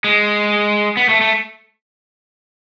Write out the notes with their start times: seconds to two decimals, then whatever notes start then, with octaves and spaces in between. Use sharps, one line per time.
0.04 G#3
0.97 B3
1.09 A3
1.21 A3